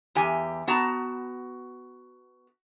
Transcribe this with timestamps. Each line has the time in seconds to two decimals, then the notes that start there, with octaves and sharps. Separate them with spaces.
0.15 E2 G4 G#5
0.68 B3 F#4 A5 A#5